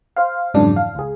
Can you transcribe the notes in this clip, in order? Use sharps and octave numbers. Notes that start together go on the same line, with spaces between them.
C5 F5
F2 G#2 C#3 E3 F#3 D4
F5
C#2 G#4